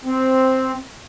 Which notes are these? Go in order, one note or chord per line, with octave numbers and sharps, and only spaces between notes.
C4